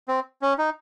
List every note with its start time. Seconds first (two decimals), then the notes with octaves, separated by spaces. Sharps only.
0.08 C4
0.42 C#4
0.58 D#4